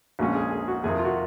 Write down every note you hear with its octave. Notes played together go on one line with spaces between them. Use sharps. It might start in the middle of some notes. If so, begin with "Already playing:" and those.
A#1 A#2 G#3 C#4 F#4
G#4
G#4
F#4
F2 C3 D#3 G#4
F4
F#4